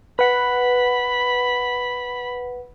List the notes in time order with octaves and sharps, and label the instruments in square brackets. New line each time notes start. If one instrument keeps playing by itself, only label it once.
[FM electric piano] B4 F#5 [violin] B5